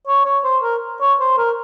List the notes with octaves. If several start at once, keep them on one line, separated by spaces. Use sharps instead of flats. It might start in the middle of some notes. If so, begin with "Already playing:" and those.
C#5
C#5
C5
A#4
C#5
C5
A#4